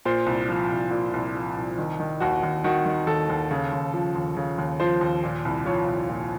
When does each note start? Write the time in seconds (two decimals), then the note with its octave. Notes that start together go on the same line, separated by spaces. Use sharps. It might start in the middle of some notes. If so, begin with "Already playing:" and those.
0.05 A#2 C5
0.26 C2
0.49 F3
0.70 C2
0.91 A#2
1.13 C2
1.35 F3
1.56 C2
1.78 D#3
2.00 D#3
2.20 D#2 F#4
2.43 D#2
2.64 D#3 F#4
2.86 D#3
3.07 D#2 A4
3.29 D#2
3.51 C#3
3.73 D#2
3.94 F3
4.15 D#2
4.36 C#3
4.58 D#2
4.80 F3 C5
5.01 D#2
5.24 A#2
5.45 C2
5.66 F3 C#5
5.88 C2
6.10 A#2